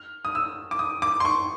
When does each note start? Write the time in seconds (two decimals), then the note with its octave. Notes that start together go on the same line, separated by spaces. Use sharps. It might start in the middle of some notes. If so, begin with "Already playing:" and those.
Already playing: F6
0.25 D#6
0.35 E6
0.71 D6
0.79 D#6
1.02 D6
1.20 C6
1.25 C#6